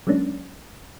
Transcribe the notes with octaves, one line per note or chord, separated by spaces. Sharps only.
F#3 G#3 A#3 C#4 D4